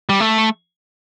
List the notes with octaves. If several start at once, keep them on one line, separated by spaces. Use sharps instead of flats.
G3
A3